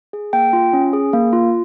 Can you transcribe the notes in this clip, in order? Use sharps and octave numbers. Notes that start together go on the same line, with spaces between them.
G#4
A#3 G5
F4
C#4
G#4
A#3
F4